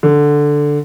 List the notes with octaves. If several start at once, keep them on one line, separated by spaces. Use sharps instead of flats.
D3